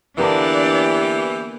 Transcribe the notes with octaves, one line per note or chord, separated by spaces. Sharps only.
D3 E3 A#3 B3 D4 G4 D5